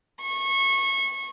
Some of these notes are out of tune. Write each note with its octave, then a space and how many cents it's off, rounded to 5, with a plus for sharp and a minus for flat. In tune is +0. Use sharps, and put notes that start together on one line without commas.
C#6 -20